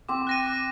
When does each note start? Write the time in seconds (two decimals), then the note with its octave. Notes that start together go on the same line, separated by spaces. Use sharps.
0.09 C4 D6
0.27 F#6 A#6 D#7
0.46 D6